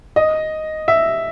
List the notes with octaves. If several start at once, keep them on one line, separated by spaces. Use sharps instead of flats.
D#5
E5